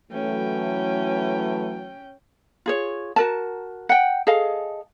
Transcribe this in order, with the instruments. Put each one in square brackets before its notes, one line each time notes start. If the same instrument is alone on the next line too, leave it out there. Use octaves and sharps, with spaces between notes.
[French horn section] E3 F#3 A3 [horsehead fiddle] C#4 G5
[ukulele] F4 G#4 C#5
F#4 A#4 A5
F#5 G5
G#4 A4 D#5 F5